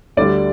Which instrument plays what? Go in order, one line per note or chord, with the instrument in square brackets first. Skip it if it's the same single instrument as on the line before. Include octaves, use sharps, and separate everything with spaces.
[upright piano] D2 D3 G3 D5